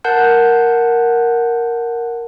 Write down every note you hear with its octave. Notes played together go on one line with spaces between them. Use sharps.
A#4 F#5 A5 F#6 G6